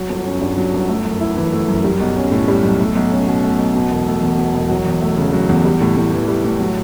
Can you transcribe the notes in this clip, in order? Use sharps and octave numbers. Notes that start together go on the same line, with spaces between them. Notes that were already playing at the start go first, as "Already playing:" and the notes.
Already playing: F#3
G1
C#4
G2
F#3
G1
A3
F#2
E4
E3
A3
F#2
G3
B1
C#4
A2
G3
B1
A3
B1
C#4
B2
A3
B1
B2
E1
A3
E2
B2
E1
F#3
E2
A3
C#3
F#3
E2
G3
A2
A2
E3
G3
A2
F#3